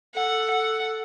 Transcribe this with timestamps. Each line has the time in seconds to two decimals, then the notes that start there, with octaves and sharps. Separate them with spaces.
0.15 A4 F#5
0.51 F#5